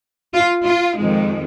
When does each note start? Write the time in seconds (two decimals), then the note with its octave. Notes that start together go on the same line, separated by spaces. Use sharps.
0.34 F4
0.65 F4
0.97 F2 D#3 G#3